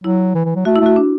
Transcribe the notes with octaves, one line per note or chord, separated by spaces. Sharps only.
F#3 E4
E3
E3
F#3
A3 F#4
E4
A3 F#4
D4